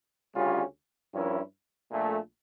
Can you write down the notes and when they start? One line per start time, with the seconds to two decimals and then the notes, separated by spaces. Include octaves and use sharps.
0.35 D2 C#3 G3 C#4 F4
1.13 G2 F3 C#4 E4 A#4
1.92 A#1 A#2 A3